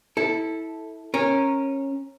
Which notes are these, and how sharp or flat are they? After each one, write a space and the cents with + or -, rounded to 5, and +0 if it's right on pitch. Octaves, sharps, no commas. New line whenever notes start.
E4 -20 A4 +0 A5 -40
C#4 -20 A#4 +0